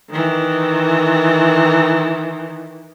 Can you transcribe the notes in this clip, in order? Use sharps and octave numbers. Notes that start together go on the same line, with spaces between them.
D#3 E3